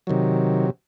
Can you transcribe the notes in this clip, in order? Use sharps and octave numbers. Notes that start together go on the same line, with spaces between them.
C3 D#3 F#3